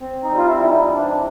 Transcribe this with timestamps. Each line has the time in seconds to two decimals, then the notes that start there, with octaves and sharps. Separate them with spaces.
0.01 C4
0.24 D#4
0.32 G3
0.37 F4
0.47 E4
0.62 E3 E4
0.70 D#4
0.93 C3 D4